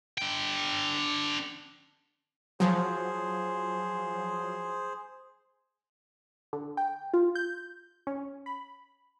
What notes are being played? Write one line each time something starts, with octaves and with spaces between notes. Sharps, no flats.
D3 G5
F3 F#3 G#4 C5
D3
G5
F4
G6
C#4
B5